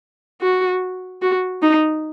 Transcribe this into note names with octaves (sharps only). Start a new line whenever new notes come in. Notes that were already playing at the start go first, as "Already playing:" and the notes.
F#4
F#4
D#4